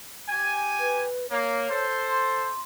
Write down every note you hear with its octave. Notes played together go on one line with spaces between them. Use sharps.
G4 G#5
B4
A#3 C#5
A4 C5
C6